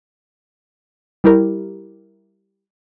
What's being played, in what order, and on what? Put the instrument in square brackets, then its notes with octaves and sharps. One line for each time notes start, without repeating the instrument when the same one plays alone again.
[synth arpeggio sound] G3 E4 G4 A#4